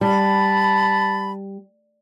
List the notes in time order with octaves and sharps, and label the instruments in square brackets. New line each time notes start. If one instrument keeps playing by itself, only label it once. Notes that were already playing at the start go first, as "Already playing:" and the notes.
[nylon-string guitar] G3 [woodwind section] A5 B5